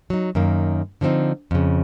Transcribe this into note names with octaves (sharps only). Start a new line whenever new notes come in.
F#3 D#4
F#2 D#3 A#3
D3 F3 G3 C4 D#4
F2 C#3